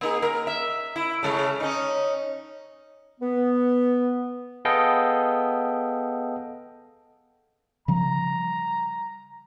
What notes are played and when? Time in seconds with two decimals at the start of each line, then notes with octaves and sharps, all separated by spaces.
0.01 A#3 D#4 G#4
0.22 A#3 A#4
0.47 E5
0.96 E4
1.23 C#3 G#3 A3
1.60 C#4 D#4
3.20 B3
4.65 B3 G#4 A4 D#5 F5 G5
7.88 C#3 F3 G3 A#5